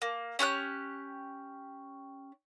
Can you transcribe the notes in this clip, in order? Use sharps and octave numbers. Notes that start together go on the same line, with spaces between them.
A#3
C#4 G4 D6 F#6